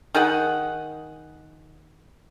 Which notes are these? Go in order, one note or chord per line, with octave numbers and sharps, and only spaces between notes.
D#3 G#4 F#5